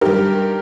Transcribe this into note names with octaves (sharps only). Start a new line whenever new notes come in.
G2 D#3 G4 A#4